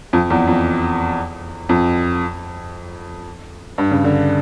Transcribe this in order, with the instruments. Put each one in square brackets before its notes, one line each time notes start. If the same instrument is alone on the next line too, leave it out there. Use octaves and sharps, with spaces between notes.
[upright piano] F2
E2
F2
F2
G2
C#3
D3